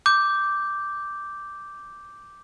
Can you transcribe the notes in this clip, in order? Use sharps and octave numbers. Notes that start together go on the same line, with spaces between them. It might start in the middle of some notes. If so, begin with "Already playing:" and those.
D6 G6